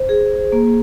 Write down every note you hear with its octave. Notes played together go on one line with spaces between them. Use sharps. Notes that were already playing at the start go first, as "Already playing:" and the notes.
Already playing: C5
G#4
A#3